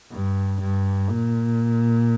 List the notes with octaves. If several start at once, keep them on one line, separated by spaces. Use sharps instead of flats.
G2
G2
A#2